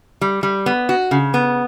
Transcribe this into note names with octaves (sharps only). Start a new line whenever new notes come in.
G3
G3
B3
F#4
C#3
B3